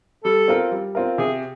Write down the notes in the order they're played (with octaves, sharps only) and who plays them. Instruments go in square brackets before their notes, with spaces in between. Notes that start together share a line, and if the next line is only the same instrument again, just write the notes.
[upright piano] G3 [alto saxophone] A4
[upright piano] C4 F4 A#4
G3
C4 F4 A#4
[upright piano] C3 [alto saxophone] G#4